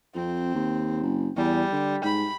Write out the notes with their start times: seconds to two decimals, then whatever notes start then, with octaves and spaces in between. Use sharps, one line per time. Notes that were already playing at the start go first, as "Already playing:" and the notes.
0.15 F2 C4
0.55 D#2
1.03 F#1
1.37 E2 G3
1.72 D3
2.04 G#2 B5